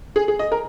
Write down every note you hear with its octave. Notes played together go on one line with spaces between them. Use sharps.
G#4
G#4
D#5
A#4